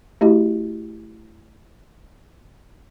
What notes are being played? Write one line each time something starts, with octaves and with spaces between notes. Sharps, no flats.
A3 E4 F#4 G4 D#5